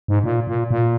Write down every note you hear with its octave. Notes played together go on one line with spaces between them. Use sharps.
G#2
A#2
A#2
A#2